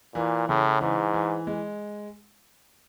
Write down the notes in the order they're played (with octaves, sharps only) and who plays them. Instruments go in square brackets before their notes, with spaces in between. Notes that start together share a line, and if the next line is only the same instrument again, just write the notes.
[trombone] A#2 [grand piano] E3
[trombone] A2 [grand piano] C#3
[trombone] G#2 [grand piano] E3
[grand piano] E3
G#3